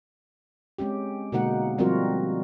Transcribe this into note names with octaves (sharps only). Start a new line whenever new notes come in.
G#3 C4 C#4 G4
B2 D3 G#3 A#3 D#4 F#5
F3 G3 C4 F4 F#4 A#4